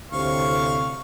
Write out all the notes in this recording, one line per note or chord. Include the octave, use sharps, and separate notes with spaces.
D2 A2 C3 F5 C#6